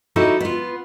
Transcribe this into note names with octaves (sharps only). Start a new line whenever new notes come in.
D#4 E4 F#4 G4 A4 D#5
B3 F4